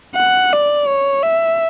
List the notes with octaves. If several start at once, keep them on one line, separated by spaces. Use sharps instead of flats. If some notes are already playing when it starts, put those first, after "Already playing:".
F#5
D5
C#5
E5